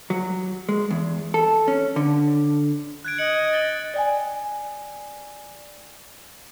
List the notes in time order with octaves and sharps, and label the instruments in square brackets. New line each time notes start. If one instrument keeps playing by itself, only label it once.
[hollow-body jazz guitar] F#3
G#3
E2
A4
C#4
D3
[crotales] F#6 G#6 D7
[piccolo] D#5 [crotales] C#7 F#7
[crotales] A6 F#7 G7
[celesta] D5 G5 G#5